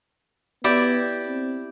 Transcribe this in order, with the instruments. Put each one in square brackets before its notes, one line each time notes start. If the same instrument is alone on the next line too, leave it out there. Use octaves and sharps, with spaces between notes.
[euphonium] B3 [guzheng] E4 G4 D5
[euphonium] C4